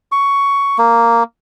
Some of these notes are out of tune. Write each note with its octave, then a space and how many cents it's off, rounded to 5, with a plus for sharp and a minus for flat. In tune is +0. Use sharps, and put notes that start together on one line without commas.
C#6 +10
A#3 -5